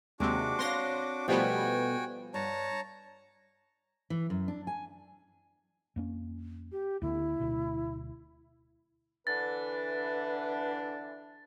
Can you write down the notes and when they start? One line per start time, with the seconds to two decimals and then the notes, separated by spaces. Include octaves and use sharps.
0.20 D#2 C3 G#3 D4 F#4 D6
0.59 C4 C#5 F5 C6 A#6
1.28 B2 F3 G3 A3 B3 F#4 G5 G#5
2.34 G2 C#5 A5 A#5
4.10 E3
4.30 F#2
4.48 D4
4.67 G#5
5.96 F2 A#3 C#4
6.72 G4
7.02 D2 D3 B3 E4
7.40 D1 D2 B2
9.27 D3 E3 D4 B4 A6